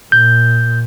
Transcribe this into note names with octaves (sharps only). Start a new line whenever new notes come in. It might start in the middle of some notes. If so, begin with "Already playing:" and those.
A#2 G6